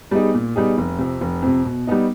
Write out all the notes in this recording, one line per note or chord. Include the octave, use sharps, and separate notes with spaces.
G3 B3 D#4 G#4
A#2
G3 B3 D#4 G#4
F1
F2 C3
F1
F2 C3
B2
G3 B3 D#4